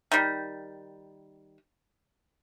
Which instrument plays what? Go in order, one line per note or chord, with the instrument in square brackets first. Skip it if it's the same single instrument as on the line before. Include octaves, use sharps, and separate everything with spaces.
[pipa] D#3 G3